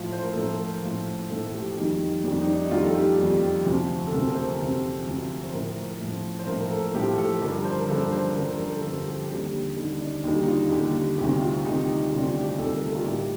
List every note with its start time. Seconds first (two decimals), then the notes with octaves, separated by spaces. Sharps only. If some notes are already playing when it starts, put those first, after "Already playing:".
Already playing: A2 F3 F4
0.12 C5
0.23 A#4
0.33 A2 F3 A4
0.44 A#4
0.83 A2 F3
1.30 A2 F3 A4
1.54 G4
1.77 F2 D#3 G3 D#4
2.24 F2 D#3 G3 D4
2.41 D#4
2.48 D4
2.65 D#4
2.71 F2 D#3 G3 F4
2.84 A4
2.95 G4
3.18 F2 D#3 G3
3.65 D2 C3 F3
4.07 A4
4.12 D2 C3 F3 A#4
4.30 A#4
4.36 C5
4.59 D2 C3 F3
5.06 D2 C3 F3
5.44 C5
5.53 A2 F3 A#4
6.00 A2 F3
6.39 C5
6.47 A2 F3 A#4
6.61 A#4
6.71 A4
6.94 A2 F3 G4
7.18 A4
7.41 G2 D3 F3 A#4
7.65 C5
7.79 A#4
7.89 G2 D3 F3 A4
8.02 A#4
8.12 C5
8.36 G2 D3 F3 A#4
8.59 A#4
8.71 A4
8.83 G2 D3 F3 A4
9.07 G4
9.30 D#2 D3 G3
9.77 D#2 D3 G3 D#4
10.00 D4
10.24 D#2 D3 G3 D#4
10.42 D#4
10.47 F4
10.71 D#2 D3 G3 G4
11.18 D2 C3 D#3 G3 G4
11.41 F4
11.65 D2 C3 D#3 G3 D#4
12.12 D2 C3 D#3 G3 D4
12.28 F4
12.44 G4
12.59 D2 C3 D#3 G3 A4
12.76 A#4
12.82 A4
12.95 F4
13.06 A2 G3 G4